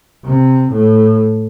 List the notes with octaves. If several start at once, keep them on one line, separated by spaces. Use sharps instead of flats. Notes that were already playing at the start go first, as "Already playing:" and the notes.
C3
A2